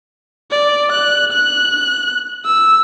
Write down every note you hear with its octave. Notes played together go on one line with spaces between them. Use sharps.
D5
F#6
F#6
E6